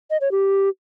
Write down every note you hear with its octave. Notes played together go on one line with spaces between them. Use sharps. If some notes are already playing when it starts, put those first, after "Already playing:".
D#5
C#5
G4